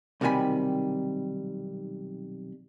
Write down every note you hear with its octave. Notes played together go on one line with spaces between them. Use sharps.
B1 C3 D#3 G3 G#5 B5